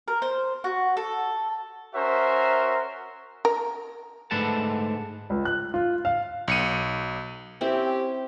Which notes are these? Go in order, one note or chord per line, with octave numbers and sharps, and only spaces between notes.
A#4
C5
F#4
A4
C#4 F#4 A#4 C5 E5
A#4
G#2 D3 A3 B4 F#5 A5
C#2
F#6
F4
F5
B1 C#7 D#7
C4 C#4 E4 G4